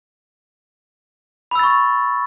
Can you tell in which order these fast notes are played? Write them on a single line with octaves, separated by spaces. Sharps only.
B5 E6 A6 C#6